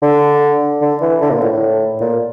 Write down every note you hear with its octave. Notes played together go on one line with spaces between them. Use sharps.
D3
D3
E3
D3
A#2
A2
A2
A#2